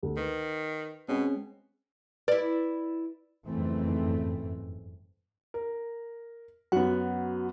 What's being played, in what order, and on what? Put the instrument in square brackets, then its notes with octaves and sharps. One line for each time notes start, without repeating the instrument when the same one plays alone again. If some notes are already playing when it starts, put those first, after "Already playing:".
[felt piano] D2
[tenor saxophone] D#3 [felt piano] B4
[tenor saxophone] B2 [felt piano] G#3 C4 C#4
[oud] E4 D5 [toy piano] B4
[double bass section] F#1 F2 G#2 E3 A3 C4
[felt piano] A#4
[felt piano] F#2 B3 [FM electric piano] F#4 F#5